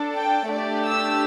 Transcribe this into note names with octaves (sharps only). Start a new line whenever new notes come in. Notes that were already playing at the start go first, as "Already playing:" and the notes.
Already playing: D4 A4
G5
A3 D4 G4 D5
E6